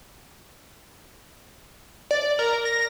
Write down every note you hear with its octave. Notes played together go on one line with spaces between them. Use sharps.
D5
A#4
A#6